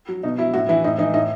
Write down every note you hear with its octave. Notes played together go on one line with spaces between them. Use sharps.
F#3
B2 D#4
F#3 E4
A2 F#4
E3 E4
A2 D#4
E3 D#4
A2 D#4